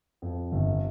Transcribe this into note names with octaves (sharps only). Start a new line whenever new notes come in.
F2
G1